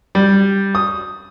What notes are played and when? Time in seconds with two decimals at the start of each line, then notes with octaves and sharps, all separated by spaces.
0.15 G3
0.75 D#6